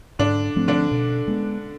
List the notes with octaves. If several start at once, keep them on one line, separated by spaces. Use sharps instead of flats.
G#2 D3 D4
F3 A3 C4
D3 D4
B2
G#3 B3